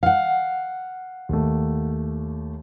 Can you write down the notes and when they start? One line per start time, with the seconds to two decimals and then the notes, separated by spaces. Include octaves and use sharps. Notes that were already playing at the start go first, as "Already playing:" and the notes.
0.03 F5 F#5
1.29 D#2 A3